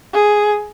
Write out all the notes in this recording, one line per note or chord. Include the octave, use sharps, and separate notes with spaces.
G#4